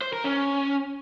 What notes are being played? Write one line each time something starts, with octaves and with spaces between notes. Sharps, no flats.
C5
A#4
C#4